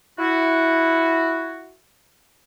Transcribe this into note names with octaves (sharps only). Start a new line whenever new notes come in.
E4 F#4